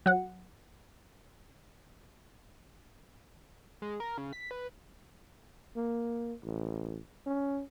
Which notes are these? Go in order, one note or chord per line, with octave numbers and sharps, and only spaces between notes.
F#3 F#5
G#3
A#4
C#3
B6
B4
A#3
A1
C#4